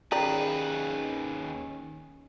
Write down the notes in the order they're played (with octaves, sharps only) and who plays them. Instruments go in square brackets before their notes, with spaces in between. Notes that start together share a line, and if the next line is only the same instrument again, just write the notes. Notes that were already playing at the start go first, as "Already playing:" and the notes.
[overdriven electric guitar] D#2 B4 [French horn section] D#3 C#4 [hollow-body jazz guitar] G4 G#4 [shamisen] D5 A#5